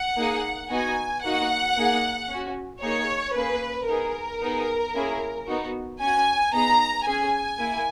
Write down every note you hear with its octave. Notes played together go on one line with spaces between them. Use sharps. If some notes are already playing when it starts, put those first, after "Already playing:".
Already playing: F#5
A#3 D#4 G#4
B3 D#4 F#4 G#5
A#3 D#4 F#4 F#5
A#3 D#4 G#4
C#4 F#4
A#3 D#4 G#4 C#5
A#3 C#4 G#4 B4
B3 D#4 G#4 A#4
B3 D#4 G#4
A#3 C#4 E4 G#4
B3 D#4 F#4
C#4 F#4 G#5
B3 D#4 G#4 A#5
C#4 G#4 G#5
A#3 E4